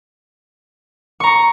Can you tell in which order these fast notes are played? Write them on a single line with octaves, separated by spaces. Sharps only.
C#6 A#5 C#7